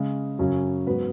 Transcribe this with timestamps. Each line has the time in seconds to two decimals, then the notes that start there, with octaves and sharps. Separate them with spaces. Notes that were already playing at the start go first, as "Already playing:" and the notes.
Already playing: C#3 G#3 C#4
0.39 F#2 C#3 F#3 C#4
0.86 G#2 F#3 B3 F#4 B4